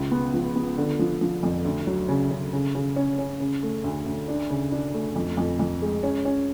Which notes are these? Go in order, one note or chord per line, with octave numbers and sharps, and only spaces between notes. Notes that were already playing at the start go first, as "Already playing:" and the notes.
Already playing: C#2 G#3
B3
F3
B3
D3
F3
F3
F2
D2
F#3
C#3
C#3
C#3
C#3
C#4
C#4
C#3
A3
D2
D2
D4
C#3
D4
A3
F2
F2
F2
G#3
C#4
C#4